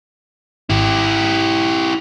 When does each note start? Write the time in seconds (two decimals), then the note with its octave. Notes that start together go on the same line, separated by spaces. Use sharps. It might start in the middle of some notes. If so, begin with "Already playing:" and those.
0.70 G#1 E4 G4